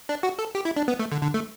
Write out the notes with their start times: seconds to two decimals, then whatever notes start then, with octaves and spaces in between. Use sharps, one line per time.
0.09 D4
0.23 F#4
0.39 A4
0.55 G4
0.65 E4
0.77 D4
0.88 B3
1.00 A3
1.12 D3
1.22 D3
1.34 A3